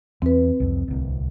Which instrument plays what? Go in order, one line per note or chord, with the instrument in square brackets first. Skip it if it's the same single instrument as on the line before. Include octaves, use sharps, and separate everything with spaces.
[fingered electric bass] E2 [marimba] C4 B4
[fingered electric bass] C2 F2
D1 C2